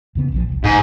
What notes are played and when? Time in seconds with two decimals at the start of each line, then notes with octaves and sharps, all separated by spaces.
0.15 E2 C#3 B3
0.32 A#1 C#3 F3
0.49 E1 C2
0.64 G#2